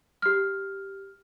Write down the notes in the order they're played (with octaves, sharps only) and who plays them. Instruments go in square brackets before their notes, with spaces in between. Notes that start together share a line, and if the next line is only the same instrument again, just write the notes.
[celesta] G4 F6